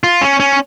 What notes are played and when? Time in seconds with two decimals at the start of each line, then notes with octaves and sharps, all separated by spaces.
0.04 F4
0.21 C#4
0.40 C#4